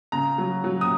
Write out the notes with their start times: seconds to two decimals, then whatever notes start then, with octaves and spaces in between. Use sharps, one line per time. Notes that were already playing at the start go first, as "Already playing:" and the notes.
0.12 C#3 A#5
0.38 F#3
0.64 F#3
0.81 D#6